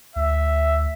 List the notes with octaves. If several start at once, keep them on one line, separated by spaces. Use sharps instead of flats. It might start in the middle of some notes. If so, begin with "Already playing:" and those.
D2 E5